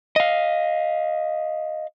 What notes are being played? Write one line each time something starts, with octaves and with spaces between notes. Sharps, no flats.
D#5 F5